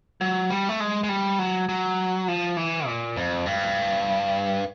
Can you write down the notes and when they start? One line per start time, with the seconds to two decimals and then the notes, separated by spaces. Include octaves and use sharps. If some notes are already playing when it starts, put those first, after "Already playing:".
0.21 F#3
0.50 G3
0.69 A3
0.80 G#3
1.04 G#3
1.09 G3
1.39 F#3
1.69 F#3
2.28 F3
2.57 E3
2.87 A#2
3.16 F2
3.46 G2